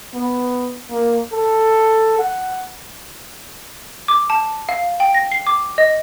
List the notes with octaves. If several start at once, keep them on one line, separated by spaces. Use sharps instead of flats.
B3
A#3
A4
F#5
D6
A5
F5
G5
A#6
C7
D6
D#5